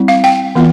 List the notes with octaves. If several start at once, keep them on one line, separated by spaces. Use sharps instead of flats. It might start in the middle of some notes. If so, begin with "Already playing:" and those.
Already playing: G3 C4 E4
F5
G5
E3 B3 F4